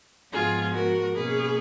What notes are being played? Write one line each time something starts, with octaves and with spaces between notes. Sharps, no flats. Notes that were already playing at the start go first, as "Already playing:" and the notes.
G#2 F3 B3 F4 G#4
F#4 A#4
B2 A#3 C#4 G#4 B4